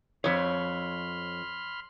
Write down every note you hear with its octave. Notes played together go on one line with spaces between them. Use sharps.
F2 C#5 B5 C6 F6